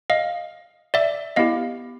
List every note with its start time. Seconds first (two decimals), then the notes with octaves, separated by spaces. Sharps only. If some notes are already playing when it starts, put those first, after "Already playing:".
0.10 D#5 F5
0.94 D5 E5
1.36 B3 E4 G4 D#5 F5